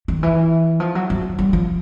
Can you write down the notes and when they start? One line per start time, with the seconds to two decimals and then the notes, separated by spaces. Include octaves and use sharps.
0.08 D#3
0.23 E3
0.80 F3
0.95 F#3
1.10 F#3
1.39 G3
1.53 F3